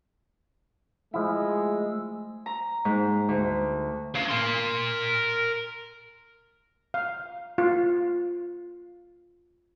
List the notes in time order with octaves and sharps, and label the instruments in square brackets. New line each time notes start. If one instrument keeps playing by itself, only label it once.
[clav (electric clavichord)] F3 E4 [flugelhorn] G#3 [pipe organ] A3 E6
[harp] A#5
G#2
D2
[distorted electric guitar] B4 F5
A#4 C6
[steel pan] F5
F4